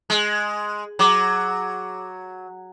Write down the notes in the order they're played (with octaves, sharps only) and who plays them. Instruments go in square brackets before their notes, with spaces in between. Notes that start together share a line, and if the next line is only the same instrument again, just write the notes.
[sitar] G#3
[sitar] F#3 [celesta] G#4 D6